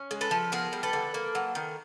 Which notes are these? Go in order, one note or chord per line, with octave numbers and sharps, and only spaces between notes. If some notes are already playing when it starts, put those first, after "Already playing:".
Already playing: C#4
G#3
A4 B4
F3
B3 G#4 A#4
G3
A4 B4
D3
A#3
F#3
D#3